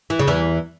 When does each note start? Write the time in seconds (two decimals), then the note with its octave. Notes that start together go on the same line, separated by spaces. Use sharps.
0.10 E3
0.19 C#3
0.27 E2 E3